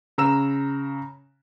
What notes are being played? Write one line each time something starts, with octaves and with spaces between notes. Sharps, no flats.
C#3 A#5 E6 E7